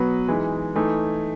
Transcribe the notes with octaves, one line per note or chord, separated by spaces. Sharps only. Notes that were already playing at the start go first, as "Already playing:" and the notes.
Already playing: B2 F#3 B3 F#4 B4
E3 G#3 D#4
E3 A3 D#4